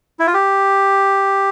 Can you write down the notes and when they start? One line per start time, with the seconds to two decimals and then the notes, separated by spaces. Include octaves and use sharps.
0.19 E4
0.27 F4
0.34 G4